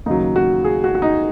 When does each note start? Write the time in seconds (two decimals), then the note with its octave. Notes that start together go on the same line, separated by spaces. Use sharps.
0.06 D#2 C#3 F#3 D#4
0.36 F#4
0.64 G#4
0.84 F#4
0.95 F#4
1.02 D#4